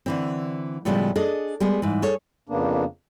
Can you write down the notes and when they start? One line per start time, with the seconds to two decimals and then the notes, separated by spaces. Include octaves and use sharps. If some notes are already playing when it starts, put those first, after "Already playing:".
0.06 D3 E3 C4
0.85 A2 C#3 F3 G3 G#3 B3
1.16 D4 G#4 A4 D#5
1.60 G3 G#3 B3 G#4
1.82 G#2 E3
2.02 G#4 A4 C#5
2.49 F2 C#3 A#3 B3 D4